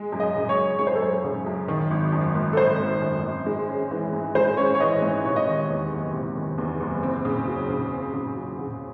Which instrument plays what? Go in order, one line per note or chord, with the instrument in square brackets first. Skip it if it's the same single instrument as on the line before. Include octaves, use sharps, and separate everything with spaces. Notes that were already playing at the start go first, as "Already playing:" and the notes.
Already playing: [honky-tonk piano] G#3
F#2
[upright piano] D#5
[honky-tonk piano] C#3
[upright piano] C#5
[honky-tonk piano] F#2
[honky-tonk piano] G#3 [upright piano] C#5
[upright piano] C5
A4
[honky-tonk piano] F#2 [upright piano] C5
[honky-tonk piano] C#3
F#2
D#3
G#1
F#2
G#1
[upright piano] A4
[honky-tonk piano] D#3 [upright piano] C5
[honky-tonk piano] G#1
F#2
G#1
G#3
C#4
E3
G#2
[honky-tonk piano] G#3 [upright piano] C5
[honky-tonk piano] C#4 [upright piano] C#5
[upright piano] C#5
[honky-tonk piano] E3 [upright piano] D#5
[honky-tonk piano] G#2 [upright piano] C#5
[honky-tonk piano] C3 [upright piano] C#5
[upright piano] D#5
[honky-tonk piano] D#3 [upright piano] C#5
[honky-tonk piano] E2
F#1
C3
D#3
E2
F#1
C4
C#3
F#3
C#3
C4
C#3
F#3
C#3